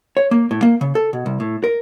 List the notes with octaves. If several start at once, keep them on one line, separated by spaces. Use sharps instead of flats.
C#5
A#3
A2
A#3
C#3
A4
B2
C2
A2
A#4